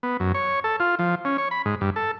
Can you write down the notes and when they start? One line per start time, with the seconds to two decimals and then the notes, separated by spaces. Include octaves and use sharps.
0.03 B3
0.20 F#2
0.34 C#5
0.64 A4
0.80 F4
0.99 F3
1.25 C#4
1.38 C#5
1.51 B5
1.66 G#2
1.81 G2
1.96 A4